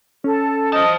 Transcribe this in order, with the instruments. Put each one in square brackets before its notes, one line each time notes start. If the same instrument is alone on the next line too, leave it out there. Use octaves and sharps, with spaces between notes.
[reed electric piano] C#4 [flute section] A4
[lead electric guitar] C5 A5 [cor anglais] D#5